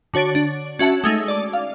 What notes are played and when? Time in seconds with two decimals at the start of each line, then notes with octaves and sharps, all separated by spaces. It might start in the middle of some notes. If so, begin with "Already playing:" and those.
0.14 D3 F#4 C#5 A6 D7
0.35 D4
0.79 C#4 F#4 E5 A5
1.04 G#3 A3 D#4
1.28 D5 D6
1.53 F5